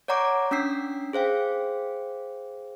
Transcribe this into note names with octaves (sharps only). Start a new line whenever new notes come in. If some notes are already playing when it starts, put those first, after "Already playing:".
C#5 D5 F#5 A#5 C#6 D6
C#4 D4 E6 B6 C7
G#4 C5 F5 G5